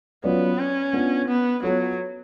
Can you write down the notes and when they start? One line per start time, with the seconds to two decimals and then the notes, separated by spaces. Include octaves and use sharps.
0.24 F#3 B3 C#4 F4 B4 D5
0.59 C#4
0.93 B3 D4 F4
1.28 B3
1.63 F#3 B3 F4 A4 C#5